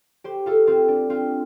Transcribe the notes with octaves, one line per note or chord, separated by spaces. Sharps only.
G4 C5
F4 A4
C4 F4
D4
C4 F4